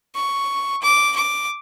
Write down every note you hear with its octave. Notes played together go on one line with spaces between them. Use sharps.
C#6
D6
D6